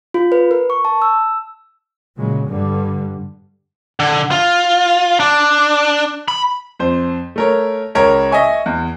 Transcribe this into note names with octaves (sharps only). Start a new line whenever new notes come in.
F4
B4
A#4
C#6
A5
E6
A#2 C#3 F#3 G#3
G2 D3 G3
D3
F4
D4
B5
F2 C5
A3 A#4 C#5
C#2 A#4 C#5 G#6
D#5 E5 G#5 C#6
E2